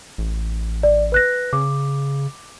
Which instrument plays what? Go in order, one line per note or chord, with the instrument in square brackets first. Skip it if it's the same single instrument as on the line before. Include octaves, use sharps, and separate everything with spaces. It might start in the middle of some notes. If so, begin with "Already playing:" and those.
[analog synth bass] A1
[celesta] D5
B4 F#6 A#6
[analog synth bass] C#3 [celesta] D6